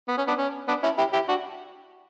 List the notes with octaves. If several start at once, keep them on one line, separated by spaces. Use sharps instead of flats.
B3
C#4
B3 D4
C#4
B3 D4
C#4 E4
E4 G4
E4 G4
D4 F#4